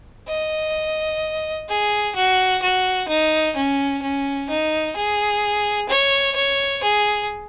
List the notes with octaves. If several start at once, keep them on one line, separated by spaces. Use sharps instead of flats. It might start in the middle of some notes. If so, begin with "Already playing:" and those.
D#5
G#4
F#4
F#4
D#4
C#4
C#4
D#4
G#4
C#5
C#5
G#4